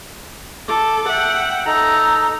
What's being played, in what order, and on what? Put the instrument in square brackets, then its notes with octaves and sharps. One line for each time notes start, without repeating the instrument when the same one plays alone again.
[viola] A4 [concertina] D6
[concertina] E5 [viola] F#5 G5
[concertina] D#4 A4 [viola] A#5